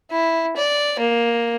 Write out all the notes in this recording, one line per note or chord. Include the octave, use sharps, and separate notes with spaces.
E4
D5
A#3